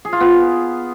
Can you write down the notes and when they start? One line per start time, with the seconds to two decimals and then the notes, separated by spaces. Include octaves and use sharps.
0.05 G#4
0.13 F4
0.20 B3